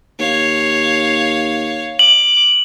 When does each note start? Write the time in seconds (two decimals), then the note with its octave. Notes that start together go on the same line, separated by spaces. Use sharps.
0.19 D#2 C#5 F5
1.99 D6 F#7